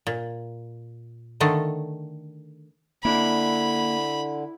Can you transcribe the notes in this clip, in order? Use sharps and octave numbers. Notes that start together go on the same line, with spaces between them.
A#2
D3 D#3 A3
D3 A#3 D4 E4 B5